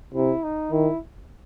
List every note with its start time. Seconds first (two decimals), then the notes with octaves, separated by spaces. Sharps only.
0.14 C3 E4
0.43 D#4
0.72 D#3 E4